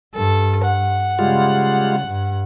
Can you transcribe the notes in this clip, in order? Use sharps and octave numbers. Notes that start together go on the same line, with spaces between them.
G2 A4
F#5
C#3 G3 G#3 F4
G2